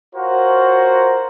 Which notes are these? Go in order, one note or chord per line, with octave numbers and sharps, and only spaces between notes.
F4 F#4 A#4 C5 C#5 F#5